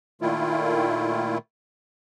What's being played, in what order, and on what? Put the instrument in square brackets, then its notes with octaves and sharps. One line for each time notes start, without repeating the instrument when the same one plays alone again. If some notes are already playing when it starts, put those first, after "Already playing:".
[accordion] A#2 D#3 A3 E4 F4